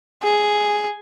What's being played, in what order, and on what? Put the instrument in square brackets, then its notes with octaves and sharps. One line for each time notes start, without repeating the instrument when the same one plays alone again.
[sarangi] G#4